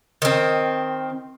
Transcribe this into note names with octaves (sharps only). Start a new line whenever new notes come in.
D#3 C4